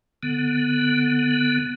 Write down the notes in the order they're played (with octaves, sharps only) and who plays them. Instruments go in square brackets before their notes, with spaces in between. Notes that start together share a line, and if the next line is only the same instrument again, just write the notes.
[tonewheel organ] D3 B3